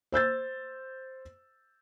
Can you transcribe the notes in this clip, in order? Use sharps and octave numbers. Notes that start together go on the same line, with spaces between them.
C5 E6 G6 A6